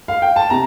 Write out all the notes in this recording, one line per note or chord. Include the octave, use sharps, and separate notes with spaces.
F5
G5
A5
C3 A#5